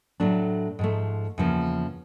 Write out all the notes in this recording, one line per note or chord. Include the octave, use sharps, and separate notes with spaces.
A2 F#3 A3 D4
G#2 F3 A3
E2 C#3 F3 A#3